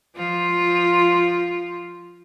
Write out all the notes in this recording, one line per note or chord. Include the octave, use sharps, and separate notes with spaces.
F3 F4